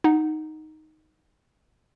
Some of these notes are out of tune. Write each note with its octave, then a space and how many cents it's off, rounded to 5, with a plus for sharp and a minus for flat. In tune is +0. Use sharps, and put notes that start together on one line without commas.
D#4 +0 F#5 +0